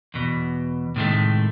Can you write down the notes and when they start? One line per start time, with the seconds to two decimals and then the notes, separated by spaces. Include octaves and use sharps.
0.14 E2 B2
0.96 A2 C3 D#3 F3 G#3 A3